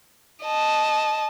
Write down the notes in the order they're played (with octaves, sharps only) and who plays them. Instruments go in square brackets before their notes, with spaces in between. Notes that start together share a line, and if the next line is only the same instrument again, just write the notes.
[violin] D#5 A5